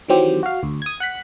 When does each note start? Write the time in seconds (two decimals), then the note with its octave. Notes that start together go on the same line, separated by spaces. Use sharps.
0.08 D#3 E3 F#3 C4 G4
0.43 F#4 F5
0.63 D2
0.82 D#6 G#6
1.00 F#5 F#6 B6